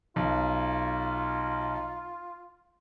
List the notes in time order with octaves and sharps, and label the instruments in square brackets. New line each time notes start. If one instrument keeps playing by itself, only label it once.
[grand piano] B1 [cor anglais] F4